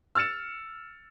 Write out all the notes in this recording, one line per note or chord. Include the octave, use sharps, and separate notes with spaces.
E6 F6 A6 C#7 E7